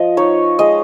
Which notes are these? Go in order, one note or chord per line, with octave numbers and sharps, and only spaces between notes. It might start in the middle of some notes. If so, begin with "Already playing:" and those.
Already playing: F3 D#5
D#4 C#5
G#3 D#5